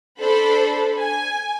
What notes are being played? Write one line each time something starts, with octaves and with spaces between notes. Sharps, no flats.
D4 A4 C5 B5
G#5